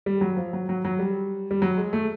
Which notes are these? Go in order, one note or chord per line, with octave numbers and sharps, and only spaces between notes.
G3
F#3
F3
F#3
F#3
F#3
G3
G3
F#3
G#3
A3